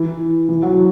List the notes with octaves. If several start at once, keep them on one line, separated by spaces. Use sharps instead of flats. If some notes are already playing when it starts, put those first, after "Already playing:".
Already playing: E3
E3
F#3